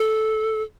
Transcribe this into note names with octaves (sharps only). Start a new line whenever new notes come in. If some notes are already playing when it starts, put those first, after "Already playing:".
Already playing: A4